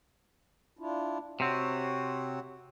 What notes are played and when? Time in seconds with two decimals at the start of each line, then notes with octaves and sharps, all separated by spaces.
0.79 D4 E4 F4
1.40 C3 C4 F#4 C#5 F#5